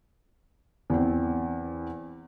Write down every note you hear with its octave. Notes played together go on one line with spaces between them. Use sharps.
E2 C4